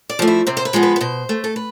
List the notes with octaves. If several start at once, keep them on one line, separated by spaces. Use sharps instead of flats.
D5
F3 A3
E4
C3 C4
C5
B4
F3 G#3 B3
B4
B4
B2 C5
A3
A4
B4